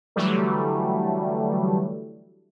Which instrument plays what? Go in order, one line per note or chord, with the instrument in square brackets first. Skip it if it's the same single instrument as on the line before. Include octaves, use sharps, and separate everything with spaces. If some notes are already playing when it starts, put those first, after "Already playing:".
[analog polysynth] D3 E3 F#3 G3 A3